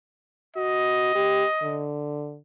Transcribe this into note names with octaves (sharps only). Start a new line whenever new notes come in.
F#4 D#5
G4
D3